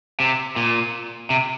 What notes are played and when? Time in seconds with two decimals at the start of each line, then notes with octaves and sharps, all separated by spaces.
0.20 C3
0.56 A#2
1.30 C3